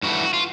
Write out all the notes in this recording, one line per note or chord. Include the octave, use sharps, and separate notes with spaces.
G2 E3 A3 F#4
F4